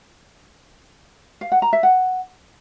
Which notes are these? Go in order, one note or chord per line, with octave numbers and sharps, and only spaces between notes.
F5
F#5
A#5
E5
F#5